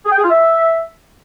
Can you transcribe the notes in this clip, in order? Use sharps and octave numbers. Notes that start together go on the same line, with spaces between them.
G#4
G5
G#4
F4
E5